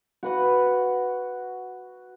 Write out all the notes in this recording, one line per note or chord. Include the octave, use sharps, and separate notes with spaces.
F#4 B4 F#5